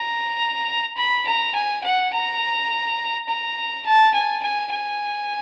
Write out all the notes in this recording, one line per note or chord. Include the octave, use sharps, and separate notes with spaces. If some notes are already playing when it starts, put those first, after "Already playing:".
Already playing: A#5
B5
A#5
G#5
F#5
A#5
A#5
A5
G#5
G#5
G#5